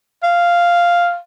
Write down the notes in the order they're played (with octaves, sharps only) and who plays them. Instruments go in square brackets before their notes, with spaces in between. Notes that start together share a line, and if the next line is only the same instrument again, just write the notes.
[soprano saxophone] F5